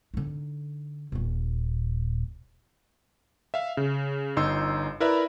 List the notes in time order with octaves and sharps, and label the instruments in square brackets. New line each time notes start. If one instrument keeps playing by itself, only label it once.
[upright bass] D3 D#4
D#1 A#2
[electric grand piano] E5 F5
C#3
G1 D#4 C6 E6
E4 A#4 B4 D5 E5